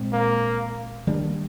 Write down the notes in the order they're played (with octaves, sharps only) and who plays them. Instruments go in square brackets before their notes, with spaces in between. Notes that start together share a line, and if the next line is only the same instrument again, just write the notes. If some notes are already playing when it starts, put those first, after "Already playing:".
Already playing: [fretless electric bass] A#2 G#3 C4
[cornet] A#3
[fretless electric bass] D#3 G3 A#3 D4